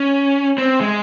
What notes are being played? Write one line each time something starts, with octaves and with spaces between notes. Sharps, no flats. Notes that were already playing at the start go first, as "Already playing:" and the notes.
Already playing: C#4
C4
G#3